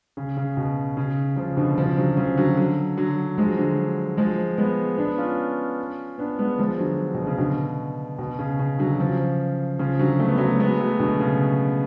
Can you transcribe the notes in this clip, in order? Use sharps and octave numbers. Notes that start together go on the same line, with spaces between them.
C#3
C#3
B2
C#3
C#3 F3
B2 D3
C#3 F3
D3 F#3
C#3 F3
D3 F#3
D3 F#3
D3 F#3
F3 G#3
D3 F#3
F3 G#3
G#3 B3
B3 D4
C#4 F4
B3 D4
G#3 B3
F3 G#3
D3 F#3
B2
C#3
B2 D3
B2
C#3
C#3
D3 F#3
C#3 F3
C#3 F3
D3 F#3
A3
B3
F#3 A3
G#3 B3
F#3 A3
B2 D3
C#3